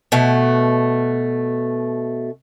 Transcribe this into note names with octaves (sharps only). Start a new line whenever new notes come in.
B2 A3